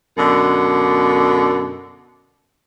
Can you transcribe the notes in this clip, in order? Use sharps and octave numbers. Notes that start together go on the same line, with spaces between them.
F#2 B2 D3